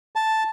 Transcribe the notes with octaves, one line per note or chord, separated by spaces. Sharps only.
A5